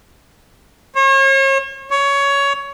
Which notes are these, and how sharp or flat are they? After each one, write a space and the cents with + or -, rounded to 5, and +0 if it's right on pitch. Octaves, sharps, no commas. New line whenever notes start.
C#5 -40
C#5 +15